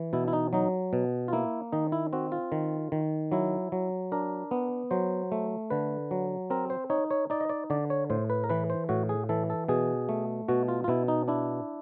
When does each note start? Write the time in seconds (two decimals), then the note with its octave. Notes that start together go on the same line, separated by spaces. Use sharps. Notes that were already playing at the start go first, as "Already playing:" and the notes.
Already playing: E3
0.13 B2 E4
0.28 E4
0.33 D#4
0.53 F#3 D#4
0.93 B2
1.28 F4
1.33 A#3 E4
1.72 D#3 D#4
1.92 E4
2.13 C4 F#4
2.32 F4
2.52 D#3
2.92 D#3
3.32 F#3 E4
3.72 F#3
4.12 D4 A#4
4.51 B3
4.91 F#3 C5
5.32 A3
5.70 D3 B4
6.11 F#3
6.50 C4 A#4
6.70 C5
6.90 D#4 C#5
7.11 C#5
7.30 D#4 D5
7.41 D#5
7.49 D5
7.70 D3 D5
7.90 C#5
8.10 A2 C5
8.30 B4
8.44 A#4
8.50 E3 B4
8.70 C5
8.89 A2 F#4
9.09 G#4
9.29 E3 A4
9.50 A4
9.68 B2 G#4
10.09 A3
10.48 B2 F#4
10.68 F4
10.84 F4
10.88 B2 E4
11.08 D#4
11.28 D4 E4